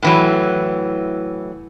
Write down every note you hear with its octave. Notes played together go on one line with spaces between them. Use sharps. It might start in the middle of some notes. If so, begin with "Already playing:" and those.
A2 E3 F#3